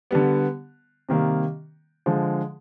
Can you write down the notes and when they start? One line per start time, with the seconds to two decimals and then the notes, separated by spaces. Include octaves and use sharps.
0.11 D3 G3 B3
1.09 C3 D#3 G3 A#3
2.06 D3 F3 G#3